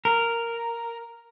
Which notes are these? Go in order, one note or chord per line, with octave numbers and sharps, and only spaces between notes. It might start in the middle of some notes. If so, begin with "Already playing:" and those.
A#4